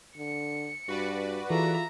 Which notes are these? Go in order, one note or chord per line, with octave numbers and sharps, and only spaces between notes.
D3 C#7
G2 F#4 B4 D5
E3 F4 G#4 A4 E5 A#5